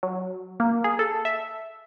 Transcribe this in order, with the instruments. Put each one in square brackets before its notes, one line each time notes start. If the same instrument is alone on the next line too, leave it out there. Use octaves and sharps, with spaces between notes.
[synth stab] F#3
A#3
G#4
A4
E5